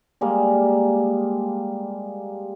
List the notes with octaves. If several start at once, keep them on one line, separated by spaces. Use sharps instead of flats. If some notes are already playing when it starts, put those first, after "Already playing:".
G3 G#3 A#3